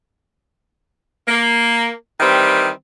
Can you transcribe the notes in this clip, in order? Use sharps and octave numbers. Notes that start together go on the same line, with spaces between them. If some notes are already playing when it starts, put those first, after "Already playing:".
A#3
D#3 E3 G3 C4